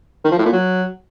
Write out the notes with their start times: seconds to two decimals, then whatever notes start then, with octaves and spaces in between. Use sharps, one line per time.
0.24 D#3
0.31 F3
0.39 A2
0.46 A#2
0.53 F#3